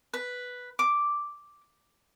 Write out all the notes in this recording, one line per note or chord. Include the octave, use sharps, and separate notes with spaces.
B4
D6